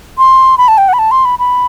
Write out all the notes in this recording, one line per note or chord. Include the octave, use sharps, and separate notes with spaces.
C6
B5
A5
G5
F#5
B5
A5
C6
B5
B5